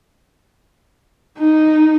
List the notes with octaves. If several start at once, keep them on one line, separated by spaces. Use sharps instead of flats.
D#4